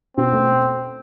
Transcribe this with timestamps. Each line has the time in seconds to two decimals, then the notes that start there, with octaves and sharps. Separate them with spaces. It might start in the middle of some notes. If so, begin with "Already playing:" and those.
0.17 B2 C4
0.32 A3